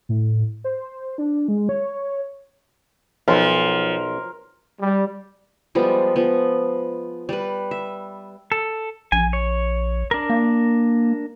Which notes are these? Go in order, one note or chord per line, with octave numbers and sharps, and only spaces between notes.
A2
C5
D4
G#3
C#5
B1 F3 A#4 C6
G3
F3 G3 G#3 B3
F3 B3
G3 B4
E5
A4
A#1 G#5
C#5
D4 A#4
A#3